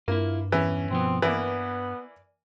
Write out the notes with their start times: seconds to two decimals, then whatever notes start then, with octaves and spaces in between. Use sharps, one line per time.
0.08 G2 A#3 E4 F4
0.52 E2 E3 C#4
0.90 B2 F3 B3 C4
1.22 E3 A#3 B3 D5